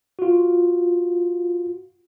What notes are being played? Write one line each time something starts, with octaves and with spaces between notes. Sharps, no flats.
F4 F#4